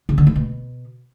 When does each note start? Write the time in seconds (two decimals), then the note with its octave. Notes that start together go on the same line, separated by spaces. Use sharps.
0.09 C#3
0.18 D3
0.27 A3
0.36 B2